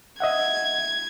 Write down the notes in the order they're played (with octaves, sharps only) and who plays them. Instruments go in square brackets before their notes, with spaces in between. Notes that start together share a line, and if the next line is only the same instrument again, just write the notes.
[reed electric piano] D#5 E5 F#5 [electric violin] G#6